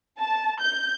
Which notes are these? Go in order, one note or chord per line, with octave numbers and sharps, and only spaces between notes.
A5
G6